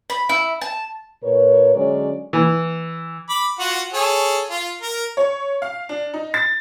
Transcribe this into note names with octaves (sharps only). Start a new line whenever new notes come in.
B5
E4
A5
A#2 A#4 B4 C#5
D3 F#3 G#3 C#4 D5
E3
B5 D6
F4 F#4 F#5
G#4 A4 C#5
F4
A#4
C#5
F5
D4
D#4
A6